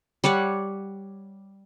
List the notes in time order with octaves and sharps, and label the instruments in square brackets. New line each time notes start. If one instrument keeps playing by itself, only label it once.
[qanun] G3 C#5 D5 F#5